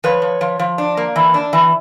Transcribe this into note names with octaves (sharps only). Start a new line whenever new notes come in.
F3 B4 C#5
F3
F3
F3
D4
A#3
E3
D4
E3